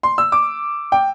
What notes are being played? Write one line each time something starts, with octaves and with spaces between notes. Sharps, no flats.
C6
E6
D6
G5